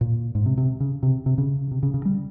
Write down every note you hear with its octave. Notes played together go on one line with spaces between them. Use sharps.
A#2
G#2
C3
C3
C#3
C3
C3
C#3
C3
C#3
C#3
G3